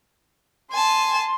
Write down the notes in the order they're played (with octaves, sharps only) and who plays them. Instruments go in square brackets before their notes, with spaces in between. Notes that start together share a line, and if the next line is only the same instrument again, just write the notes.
[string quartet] G#5 A5 [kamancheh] C6